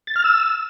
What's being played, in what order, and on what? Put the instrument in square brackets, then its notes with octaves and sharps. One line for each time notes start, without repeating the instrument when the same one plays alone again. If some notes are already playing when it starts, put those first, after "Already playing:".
[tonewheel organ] A6
F6
E6